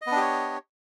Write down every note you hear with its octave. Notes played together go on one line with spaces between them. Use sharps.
B3 D4 G4 C#5 D#5